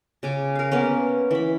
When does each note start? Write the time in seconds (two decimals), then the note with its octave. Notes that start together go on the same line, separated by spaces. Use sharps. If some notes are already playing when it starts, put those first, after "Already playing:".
0.23 C#3 G#5 D6
0.55 A#4 F5
0.71 A#3 B3 C#4
1.31 E3 B5